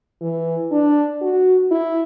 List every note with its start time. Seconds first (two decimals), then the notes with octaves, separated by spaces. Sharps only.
0.22 E3
0.72 D4
1.22 F#4
1.72 E4